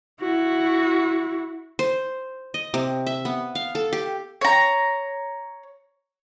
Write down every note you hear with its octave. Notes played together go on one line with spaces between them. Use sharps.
E4 F#4
C5
D#5
C3
E5
B3
F5
A4
G4
C#5 A#5